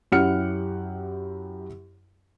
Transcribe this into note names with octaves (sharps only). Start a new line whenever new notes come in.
F#2 E4 G4 F#5 F6 C#7